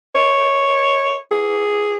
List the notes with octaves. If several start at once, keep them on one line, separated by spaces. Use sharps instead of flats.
C#5
G#4